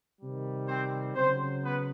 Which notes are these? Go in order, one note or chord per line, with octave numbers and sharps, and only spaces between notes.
C3 D#3 G3
C4 C5
C#3 F#3 C4 C5
B3 B4